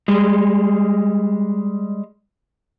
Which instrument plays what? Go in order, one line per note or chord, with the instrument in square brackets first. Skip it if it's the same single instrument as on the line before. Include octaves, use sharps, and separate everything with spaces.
[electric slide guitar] G3 G#3